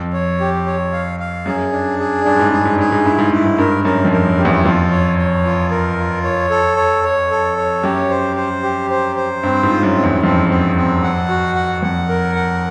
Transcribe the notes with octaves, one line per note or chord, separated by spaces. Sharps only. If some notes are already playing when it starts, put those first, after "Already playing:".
Already playing: F2
C#5
G4
C#5
F5
F5
F#2 G#4
D4
G#4
G2 D4
G#2
G2 G#4
G#2
G2 G#4
G#2
G2 E4
G#2
G2 E4
G#2
G2 A#4
F#2 A#4
F2
A#4
F#2
G4
E2
F2 F4
C#5
C#5
F4
A#4
F4
C#5
A4
C#5
C#5
A4
C#5
F#2 G4
C5
C5
G4
C5
C5
G2 C4
G#2
F4
F#2
C4
E2
F2 C4
C4
C4
F#5
F#4
F#5
F2 F#5
A#4
F#5